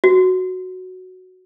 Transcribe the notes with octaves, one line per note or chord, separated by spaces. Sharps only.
F#4